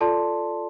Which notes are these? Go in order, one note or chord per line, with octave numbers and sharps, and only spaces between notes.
F4 A4 D5 A5 C6